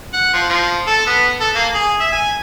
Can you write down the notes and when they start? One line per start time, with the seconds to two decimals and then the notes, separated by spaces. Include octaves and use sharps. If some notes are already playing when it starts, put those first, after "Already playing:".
0.13 F#5
0.33 F3
0.49 F3
0.87 A4
1.06 B3
1.40 A4
1.55 A#3
1.74 G#4
2.00 E5
2.12 G#5